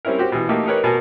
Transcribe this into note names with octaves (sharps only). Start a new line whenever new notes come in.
G3 C4 C#4 E4 A#4
F#4 G4 C5
B2 E3
A3 A#3 D#4 G4
D#4 G4 A#4 B4 C#5
B2 F#4 A#4 G#5 A5